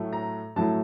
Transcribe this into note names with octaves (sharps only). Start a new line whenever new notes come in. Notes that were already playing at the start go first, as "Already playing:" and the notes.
Already playing: A2 F#3 A3
A#5
A2 F#3 A3 A5